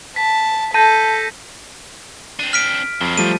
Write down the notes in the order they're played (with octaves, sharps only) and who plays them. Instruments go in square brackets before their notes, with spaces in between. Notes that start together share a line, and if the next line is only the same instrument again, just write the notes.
[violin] A5 [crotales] B6
[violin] A4 [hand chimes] A5 [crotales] G6 A#6 D#7
[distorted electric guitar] C4 D4 [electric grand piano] D#7
[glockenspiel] F6 B6 D7
[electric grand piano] F2 [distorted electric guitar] F#3 F4
[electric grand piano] F3 G3 A3 [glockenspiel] D#7